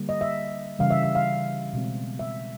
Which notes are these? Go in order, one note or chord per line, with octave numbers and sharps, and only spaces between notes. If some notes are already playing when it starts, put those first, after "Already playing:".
Already playing: D3 G3 A#3
D#5
E5
C#3 E3 G3 F5
E5
E5
F5
B2 G#3 C4
E5